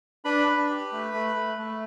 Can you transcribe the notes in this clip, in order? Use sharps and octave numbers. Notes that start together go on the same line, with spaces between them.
D4 B4 B5
D4
G4
A3
A3
A3
A3